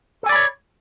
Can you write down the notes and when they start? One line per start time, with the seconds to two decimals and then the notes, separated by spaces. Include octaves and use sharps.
0.23 A4
0.26 G#5
0.29 D5
0.32 B5
0.35 C#5